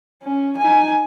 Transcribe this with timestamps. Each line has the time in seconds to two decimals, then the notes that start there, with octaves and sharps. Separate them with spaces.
0.23 C#4
0.57 D#4 G#5